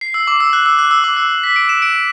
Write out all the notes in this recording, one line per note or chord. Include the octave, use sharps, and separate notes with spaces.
C7
E6
D6
E6
F#6
E6
F#6
E6
D6
E6
B6
D7
E7
D7